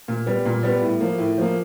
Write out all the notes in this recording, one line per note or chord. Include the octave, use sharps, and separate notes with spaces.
A#2
G3 B3
A#2
G3 B3
A2
F3 A#3
A2
F3 A#3